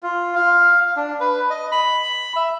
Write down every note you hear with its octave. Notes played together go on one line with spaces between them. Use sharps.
F4
F5
D4
B4
D#5
B5
E5